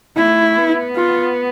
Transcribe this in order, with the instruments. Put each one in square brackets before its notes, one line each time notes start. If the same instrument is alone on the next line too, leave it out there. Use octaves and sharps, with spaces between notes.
[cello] A3 [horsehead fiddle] E4
[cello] B3
[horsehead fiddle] F4